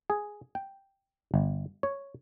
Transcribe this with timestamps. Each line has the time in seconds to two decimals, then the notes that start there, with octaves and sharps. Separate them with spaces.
0.10 G#4
0.55 G5
1.34 G1
1.83 C#5